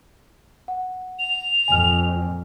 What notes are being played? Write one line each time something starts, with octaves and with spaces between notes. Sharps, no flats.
F#5
F7
F2 A#2 G#5 F6